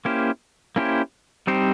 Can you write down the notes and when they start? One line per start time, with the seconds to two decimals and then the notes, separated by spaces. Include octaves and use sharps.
0.05 A#3 C#4 E4 G4 C5
0.76 A#3 C#4 E4 G4 C5
1.47 G3 C4 D#4 G4 C5